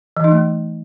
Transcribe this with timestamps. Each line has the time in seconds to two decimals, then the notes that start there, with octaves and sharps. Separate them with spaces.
0.17 E3
0.24 D#4
0.32 A3